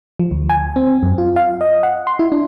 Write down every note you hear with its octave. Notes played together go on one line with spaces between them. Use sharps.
F3
D2
G#5
C4
F#2
F4
F5
D#5
F#5
C6
E4
D4